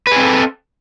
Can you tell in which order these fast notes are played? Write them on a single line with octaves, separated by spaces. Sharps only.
B4 G#4 C4 A4